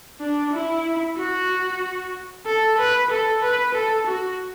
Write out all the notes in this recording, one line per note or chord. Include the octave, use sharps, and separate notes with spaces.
D4
E4
F#4
A4
B4
A4
B4
A4
F#4